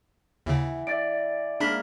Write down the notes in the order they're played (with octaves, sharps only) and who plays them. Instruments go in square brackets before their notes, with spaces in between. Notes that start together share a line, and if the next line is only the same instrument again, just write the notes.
[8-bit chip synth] D#2 C#3 [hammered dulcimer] E3 F#5
[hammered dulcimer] D5 [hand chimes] E5 A6 D7
[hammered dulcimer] G#2 A#3 F5 [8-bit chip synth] D4 B5 B6